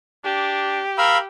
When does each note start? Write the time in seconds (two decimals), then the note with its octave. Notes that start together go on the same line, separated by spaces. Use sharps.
0.25 D4 G4
0.98 A#4 F5 B5 E6